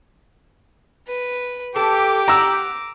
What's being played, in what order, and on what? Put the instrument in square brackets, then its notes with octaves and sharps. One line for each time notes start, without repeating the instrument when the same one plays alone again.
[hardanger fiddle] B4
[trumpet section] G4 [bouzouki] A4 [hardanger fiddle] D6
[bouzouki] F#5 [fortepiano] A#5 E6